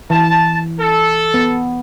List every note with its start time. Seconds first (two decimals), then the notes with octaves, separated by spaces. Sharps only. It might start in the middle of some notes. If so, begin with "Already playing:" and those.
0.10 E3 A5
0.80 A4
1.34 B3